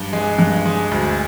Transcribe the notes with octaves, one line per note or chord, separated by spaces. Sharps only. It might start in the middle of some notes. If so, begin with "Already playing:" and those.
Already playing: G2
G#3
G2
G#3
D2